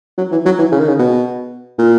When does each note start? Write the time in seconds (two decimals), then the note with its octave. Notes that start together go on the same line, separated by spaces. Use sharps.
0.18 F#3
0.32 E3
0.45 F#3
0.58 E3
0.72 C#3
0.80 D#3
0.88 C#3
0.99 B2
1.78 A#2